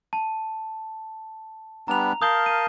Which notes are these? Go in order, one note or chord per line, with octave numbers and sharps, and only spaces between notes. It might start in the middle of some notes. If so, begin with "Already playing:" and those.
A5
G3 B3 D4 A#5 F7
A#4 F5 A5 D#6 G6 G7
D#7